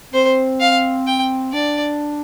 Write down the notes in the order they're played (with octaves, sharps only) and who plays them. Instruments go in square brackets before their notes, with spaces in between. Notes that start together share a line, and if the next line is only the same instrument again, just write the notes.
[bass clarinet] C4 [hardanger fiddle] C5
[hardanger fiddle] F5
G5
[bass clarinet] D4 [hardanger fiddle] D5